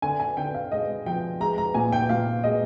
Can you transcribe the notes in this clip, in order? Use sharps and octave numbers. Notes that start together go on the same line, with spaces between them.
D3 G#5
G#5
D3 G5
F5
G#3 D#5
F3 G5
G#3 A#5
A#5
A#2 G#5
G5
A#2 F5
G#3 D#5